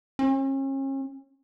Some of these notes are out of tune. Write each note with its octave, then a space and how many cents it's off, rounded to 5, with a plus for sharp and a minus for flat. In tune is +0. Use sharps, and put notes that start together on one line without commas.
C#4 -40